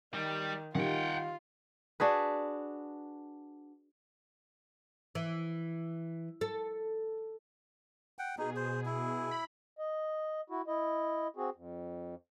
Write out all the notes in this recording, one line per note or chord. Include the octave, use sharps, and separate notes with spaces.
D#3 G3
D#3 G3 F4 F#5 G5
D4 F#4 G#4 B4
E3
A4
F#5 G5
B2 D#4 G#4
C5
E4
B5
D#5
E4 F#4
E4 D#5
C4 F#4 G#4
F2